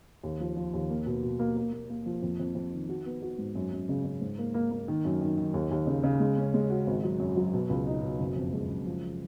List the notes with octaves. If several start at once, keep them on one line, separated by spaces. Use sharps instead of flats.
D#2
F3
F3
D#2
A#3
B2
B2
A#3
A#3
A#3
A#3
F3
F2
F2
F2
D#3
F#4
B3
F#4
G#2
F#2
F#2
C#3
C#3
G#2
A#3
A#3
A#3
D#3
F#2
D#3
D#3
D#2
D#2
C#3
C#3
G#3
C#4
G#3
F#4
G#1
F#3
F#2
F#3
B2
C#2
D#4
B2
F#1
F2
G#3
F#1
F3